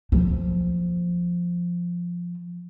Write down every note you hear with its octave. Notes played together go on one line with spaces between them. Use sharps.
F3 A#3